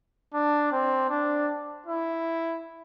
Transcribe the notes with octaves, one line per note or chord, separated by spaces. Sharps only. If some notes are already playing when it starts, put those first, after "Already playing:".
D4
C4
D4
E4